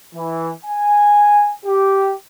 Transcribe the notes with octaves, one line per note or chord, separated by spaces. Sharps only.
E3
G#5
G4